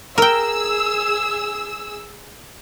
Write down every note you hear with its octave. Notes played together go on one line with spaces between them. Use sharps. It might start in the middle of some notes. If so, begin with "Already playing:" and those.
G#4 A#4 G5 E6